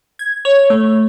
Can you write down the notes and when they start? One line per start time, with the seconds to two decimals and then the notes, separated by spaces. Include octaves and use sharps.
0.19 G#6
0.45 C#5
0.70 A3